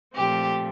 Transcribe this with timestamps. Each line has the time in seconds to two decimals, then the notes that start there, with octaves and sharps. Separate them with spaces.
0.15 A#2 F3 A3 C4 G4